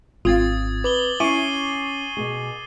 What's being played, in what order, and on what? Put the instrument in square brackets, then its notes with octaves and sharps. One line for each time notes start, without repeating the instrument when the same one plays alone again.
[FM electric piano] G#1 [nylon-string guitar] C4 G5 [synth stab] F4 [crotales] D#6 G#6 A6
[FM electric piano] B4 [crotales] D6 F#7 G7
[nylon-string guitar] C#4 [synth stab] E4 [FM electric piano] G#5 C#6 D6 [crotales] C7 D#7
[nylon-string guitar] B2 B3 G#4